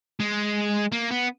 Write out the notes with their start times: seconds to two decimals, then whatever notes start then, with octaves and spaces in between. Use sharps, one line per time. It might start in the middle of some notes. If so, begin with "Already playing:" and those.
0.20 G#3
0.92 A#3
1.11 B3